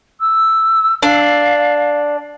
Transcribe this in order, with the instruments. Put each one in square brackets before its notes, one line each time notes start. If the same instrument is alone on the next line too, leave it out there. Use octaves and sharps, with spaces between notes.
[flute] E6
[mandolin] D4 [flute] F5